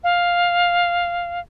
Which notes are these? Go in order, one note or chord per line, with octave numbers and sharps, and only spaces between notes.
F5